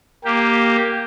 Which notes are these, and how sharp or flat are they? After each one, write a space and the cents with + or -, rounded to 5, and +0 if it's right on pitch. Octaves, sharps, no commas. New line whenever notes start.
A#3 +0 G4 +0